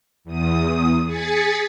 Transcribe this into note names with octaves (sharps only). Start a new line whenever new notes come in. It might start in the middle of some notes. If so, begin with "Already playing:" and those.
E2 D#6
G#4 G#6 A6 B6 C#7